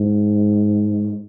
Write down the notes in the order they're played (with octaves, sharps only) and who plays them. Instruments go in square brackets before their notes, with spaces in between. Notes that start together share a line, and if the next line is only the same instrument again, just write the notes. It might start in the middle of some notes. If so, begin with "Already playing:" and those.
Already playing: [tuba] G#2